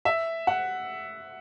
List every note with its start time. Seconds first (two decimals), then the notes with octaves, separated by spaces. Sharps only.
0.05 E5
0.47 F#5